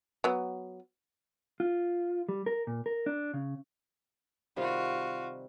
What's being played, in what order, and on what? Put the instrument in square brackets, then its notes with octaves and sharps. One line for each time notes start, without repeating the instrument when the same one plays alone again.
[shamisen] F#3 B3
[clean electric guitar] F4
G3
A#4
A#2
A#4
D4
C#3
[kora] C3 D#3 G3 [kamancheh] F4 F#4